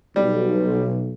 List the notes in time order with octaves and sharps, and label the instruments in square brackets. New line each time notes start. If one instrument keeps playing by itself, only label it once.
[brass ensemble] B1 [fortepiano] G3